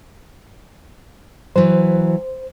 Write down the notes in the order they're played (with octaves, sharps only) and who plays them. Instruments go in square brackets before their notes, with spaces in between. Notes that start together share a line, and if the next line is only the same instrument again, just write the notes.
[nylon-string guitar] E3 F#3 [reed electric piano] C5